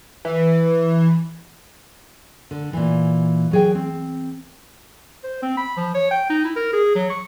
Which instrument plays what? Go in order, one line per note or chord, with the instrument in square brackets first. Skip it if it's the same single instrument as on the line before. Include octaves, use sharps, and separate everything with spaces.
[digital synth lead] E3
[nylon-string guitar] D3
A#2 E3
F#3 G#4 G5
C4
[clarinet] C5
C4
B5
F3
C#5
G5
D#4
E4
A#4
G#4
F#3
C#6